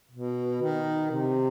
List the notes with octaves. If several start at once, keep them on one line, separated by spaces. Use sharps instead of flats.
B2
D#3
C3